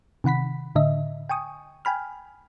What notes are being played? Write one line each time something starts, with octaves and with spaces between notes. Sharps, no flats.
C3 D#3 F#5 B5 B6
A2 D3 D#5 E5
G5 G#5 C#6 D#6
G5 G#5 B5 F6